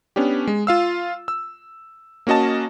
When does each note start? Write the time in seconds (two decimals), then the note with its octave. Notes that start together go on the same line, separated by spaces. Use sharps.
0.16 B3 C#4 D4 G4
0.47 G#3
0.67 F4 F5 E6
1.28 E6
2.27 A#3 C#4 F#4 D#5 A5